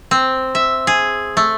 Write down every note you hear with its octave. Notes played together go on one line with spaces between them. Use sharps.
C4
E5
G#4
A3